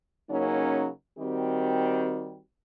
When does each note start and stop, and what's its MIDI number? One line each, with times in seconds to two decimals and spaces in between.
0.30 0.89 49
0.30 0.89 54
0.30 0.89 58
0.30 0.89 61
0.30 0.89 63
1.19 2.39 51
1.19 2.39 55
1.19 2.39 60
1.19 2.39 66
1.19 2.39 67